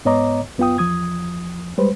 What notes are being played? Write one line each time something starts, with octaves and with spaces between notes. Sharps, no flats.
G#2 B3 C#5 D#5 A#5 D6
F#2 B3 F4 G5 D#6
E2 F3 D#6 G#6
G3 G#3 B4 C5